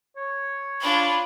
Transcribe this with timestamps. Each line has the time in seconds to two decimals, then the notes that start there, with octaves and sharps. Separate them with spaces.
0.17 C#5
0.81 D4 F4 B5